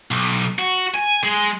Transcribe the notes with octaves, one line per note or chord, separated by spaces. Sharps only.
B1
F#4
G#5
G#3